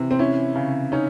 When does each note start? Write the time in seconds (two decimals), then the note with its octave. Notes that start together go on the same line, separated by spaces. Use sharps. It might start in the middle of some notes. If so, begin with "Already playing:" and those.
Already playing: C3 E3
0.11 C4
0.19 C#4 E4
0.55 C#3
0.92 C#4 D#4